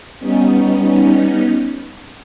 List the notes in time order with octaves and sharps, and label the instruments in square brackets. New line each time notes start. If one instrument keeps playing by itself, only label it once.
[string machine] G3 B3 C#4 D#4